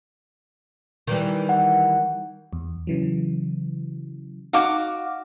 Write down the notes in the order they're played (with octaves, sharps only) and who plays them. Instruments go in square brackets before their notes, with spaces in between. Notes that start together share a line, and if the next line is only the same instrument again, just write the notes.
[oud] D#3 E3 G3
[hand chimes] F#5
[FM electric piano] E2
C#3 E3 F#3
[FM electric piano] D#4 [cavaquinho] F#4 F5 D6